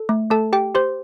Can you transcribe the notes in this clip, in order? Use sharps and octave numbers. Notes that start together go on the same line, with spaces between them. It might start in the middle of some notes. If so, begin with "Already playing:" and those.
Already playing: A4
A3
A3 A4 A5
G4 G5
G4 C5 C6